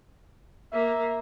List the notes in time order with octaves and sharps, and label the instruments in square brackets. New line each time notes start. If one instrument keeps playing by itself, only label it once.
[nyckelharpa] A#3 [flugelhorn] E5